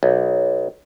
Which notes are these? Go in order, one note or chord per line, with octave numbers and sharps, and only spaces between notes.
B1